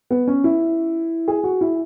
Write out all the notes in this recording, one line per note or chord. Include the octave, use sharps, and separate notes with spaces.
B3
C#4
E4
G#4
F#4
E4